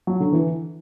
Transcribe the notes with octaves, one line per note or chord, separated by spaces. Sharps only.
F#3
D3
E3